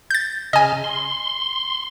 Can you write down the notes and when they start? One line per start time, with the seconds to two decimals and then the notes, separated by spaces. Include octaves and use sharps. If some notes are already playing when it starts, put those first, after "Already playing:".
0.10 G6 A6
0.53 C#3 D#5 G#5 F6
0.84 C6